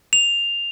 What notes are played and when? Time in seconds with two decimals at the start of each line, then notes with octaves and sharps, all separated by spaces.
0.13 F7